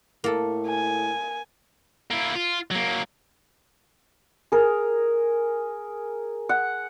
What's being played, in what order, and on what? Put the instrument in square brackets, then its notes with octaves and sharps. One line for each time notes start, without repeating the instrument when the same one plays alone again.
[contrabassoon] A2 [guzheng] A#3 A4
[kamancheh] G#5
[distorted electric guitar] A#3 E4
F4
F#3 A#3
[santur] G#4 A#4
F#5